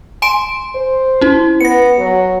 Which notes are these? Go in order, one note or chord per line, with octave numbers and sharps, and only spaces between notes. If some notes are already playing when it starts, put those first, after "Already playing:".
G#5 C6 D7
C5
C#4 E4
B3 A#6 C#7
F#3